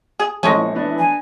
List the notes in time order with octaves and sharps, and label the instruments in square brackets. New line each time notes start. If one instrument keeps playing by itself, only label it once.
[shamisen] G#4
[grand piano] A#1 C#6 A#6 [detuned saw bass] E3 [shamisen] G#3 A3 C#4
[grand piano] B3 D4
[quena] G#5